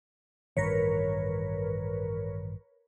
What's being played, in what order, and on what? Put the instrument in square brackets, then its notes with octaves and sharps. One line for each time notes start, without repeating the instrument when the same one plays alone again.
[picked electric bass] A1 G2 D#3 [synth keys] A#4 B4 C#5